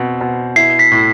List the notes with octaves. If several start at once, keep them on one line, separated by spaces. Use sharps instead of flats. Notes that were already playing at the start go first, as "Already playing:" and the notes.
Already playing: B2 C4
B2
E4 C7
B6
A2